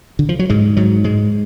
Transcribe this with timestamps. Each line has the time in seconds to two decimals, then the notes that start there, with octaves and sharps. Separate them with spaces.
0.19 D3
0.29 F3
0.39 F#3
0.50 G#2 G#3
0.77 G#2 F#3
1.04 G#2 G#3